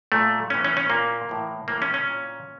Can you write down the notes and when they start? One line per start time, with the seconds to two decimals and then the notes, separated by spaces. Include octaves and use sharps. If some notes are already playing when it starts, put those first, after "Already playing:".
0.12 A#2 A3
0.50 A2 E3 C#4
0.64 C#4
0.77 C#4
0.89 A#2 A#3
1.29 A2 E3
1.68 A2 E3 A#3
1.82 C#4
1.94 C#4
2.08 A#2